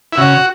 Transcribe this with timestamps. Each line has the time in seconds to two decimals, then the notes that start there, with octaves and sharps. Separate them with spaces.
0.13 E4
0.17 C#3 F#4